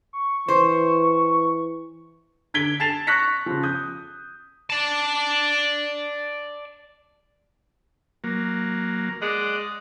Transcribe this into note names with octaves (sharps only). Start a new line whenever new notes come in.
C#6
E3 C5
D3 G#6 B6 D7 G7
A5 G#6 A6 C7 E7 F7
C#6 F#6 A#6 B6 C#7
C#3 F3
D#6 G6
D5 A5
F#3 A#3
G#3 D5 D#5 F#5